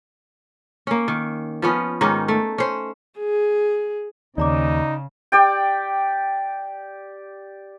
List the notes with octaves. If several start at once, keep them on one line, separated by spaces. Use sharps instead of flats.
A#3 C#4
D#3
F3 B3 C#4
G#2 D#3 C#4 D#4
A3
C#4 C5
G#4
D#2 C#3 D#4 D5 A#5 D6
G4 D5 G5